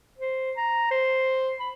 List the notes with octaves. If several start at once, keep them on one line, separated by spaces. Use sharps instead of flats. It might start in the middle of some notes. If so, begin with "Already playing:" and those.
C5
A#5
C5
B5